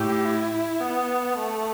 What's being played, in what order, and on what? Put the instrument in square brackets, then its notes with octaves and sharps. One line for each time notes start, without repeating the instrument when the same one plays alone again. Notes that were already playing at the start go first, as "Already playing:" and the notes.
Already playing: [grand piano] A2 [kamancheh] G4
[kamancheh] E4
B3
A3